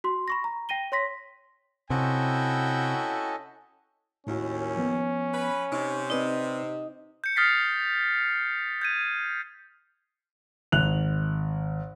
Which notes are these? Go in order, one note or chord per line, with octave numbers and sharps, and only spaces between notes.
F#4 C6
B5 C#6 A#6
A#5
G5 A#6 D#7 G7
C#5 C6 A#6 B6
C3 C#4 E4 F#4 A4 D#5 G5
D#2 A2 C#4 E4 F#4
F3 B3
B4
C3 D#4 C#6
C4 D#4 B4 D5 D#5
G6 C#7
D#6 F6 A6 B6 C7
G6 G#6 D#7
G#1 F#6 F7